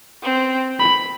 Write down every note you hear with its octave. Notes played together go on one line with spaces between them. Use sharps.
C4
B5